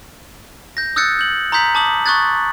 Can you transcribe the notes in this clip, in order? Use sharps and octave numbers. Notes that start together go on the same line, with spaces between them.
G6 A#6
D#6 E6 F#6 G6 A6 C#7
G6 F#7
A#5 C6 D#6 G6 B6 F#7
A5 D6 D#6 F#7
C#6 D#6 F#6 G#6 A6